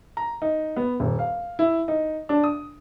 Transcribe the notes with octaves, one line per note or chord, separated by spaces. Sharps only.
A#5
D#4
B3
D#1
F5
E4
D#4
D4
D#6